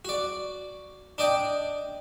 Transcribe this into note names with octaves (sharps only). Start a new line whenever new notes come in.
F#4 D5
D4 D5 D#5 G5